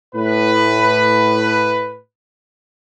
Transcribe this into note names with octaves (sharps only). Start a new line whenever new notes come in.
A2 B4